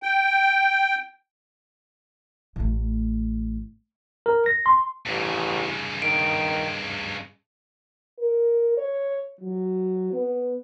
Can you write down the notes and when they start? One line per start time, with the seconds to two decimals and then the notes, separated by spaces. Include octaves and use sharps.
0.03 G5
2.56 A1 A3
4.26 A#4
4.46 A#6
4.66 C6
5.06 A1 G2 C#3
6.02 D#3 D7
8.19 A#4
8.78 C#5
9.41 F#3
10.13 B3